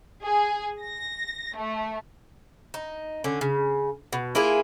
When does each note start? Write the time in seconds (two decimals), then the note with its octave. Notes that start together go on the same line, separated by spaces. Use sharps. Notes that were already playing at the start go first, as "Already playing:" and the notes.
0.22 G#4
0.81 A#6
1.56 A3
2.74 D#4
3.24 D3 C#4
3.41 C#3
4.13 B2
4.35 A#3 E4 F4 G#4